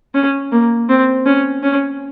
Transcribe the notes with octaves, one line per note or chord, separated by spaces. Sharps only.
C#4
A#3
C4
C#4
C#4